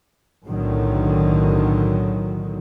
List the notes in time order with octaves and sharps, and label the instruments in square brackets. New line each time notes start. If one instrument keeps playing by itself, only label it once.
[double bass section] B1 A2 D3 D#3 F#3